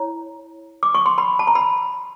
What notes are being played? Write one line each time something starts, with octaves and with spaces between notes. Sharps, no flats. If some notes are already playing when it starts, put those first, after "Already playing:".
Already playing: E4 C#5 A#5
D6
C#6
C6
B5
A5
A#5
B5